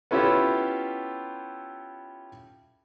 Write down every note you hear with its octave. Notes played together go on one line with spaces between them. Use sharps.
B3 C#4 E4 F4 G4 A4